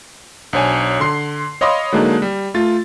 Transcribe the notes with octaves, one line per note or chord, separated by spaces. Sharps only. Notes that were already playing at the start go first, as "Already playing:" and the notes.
B1 D4 C5 C#5 G#5
D3 C6 C7
C#5 D#5 F5 B5 C6 D6
D3 F#3 G#3 A#3 D4 D#4
G3
A3 F4 A6